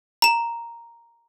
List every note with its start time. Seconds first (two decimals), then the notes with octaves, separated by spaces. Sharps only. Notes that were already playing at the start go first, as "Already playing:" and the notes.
0.22 A#5 E7